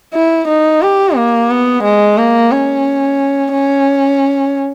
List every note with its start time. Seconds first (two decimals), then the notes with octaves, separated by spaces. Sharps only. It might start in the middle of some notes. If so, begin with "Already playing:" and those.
0.14 E4
0.48 D#4
0.82 G4
1.16 A#3
1.50 B3
1.83 G#3
2.17 A#3
2.51 C#4
3.53 C#4